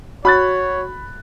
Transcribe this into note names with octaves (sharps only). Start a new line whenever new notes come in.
F#4 C#5 B5 F#6 A6